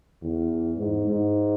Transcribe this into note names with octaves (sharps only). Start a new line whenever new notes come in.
E2
G#2
G#2